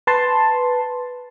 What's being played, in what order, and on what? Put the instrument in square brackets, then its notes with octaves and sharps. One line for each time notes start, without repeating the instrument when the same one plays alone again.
[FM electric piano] B4 A5 C6